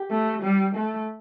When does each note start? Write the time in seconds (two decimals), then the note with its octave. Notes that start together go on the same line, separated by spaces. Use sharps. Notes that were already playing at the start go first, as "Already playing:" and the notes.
Already playing: G4
0.11 A3
0.42 G3
0.75 A3